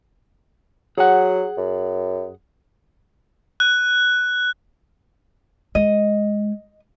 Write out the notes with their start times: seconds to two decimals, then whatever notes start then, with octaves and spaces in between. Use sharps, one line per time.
0.98 F#3 G#4 F#5
1.57 F#2
3.60 F#6
5.75 G#3 D#5